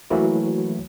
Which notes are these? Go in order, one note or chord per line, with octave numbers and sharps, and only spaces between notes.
E3 F#3 A3 A#3 E4 F#4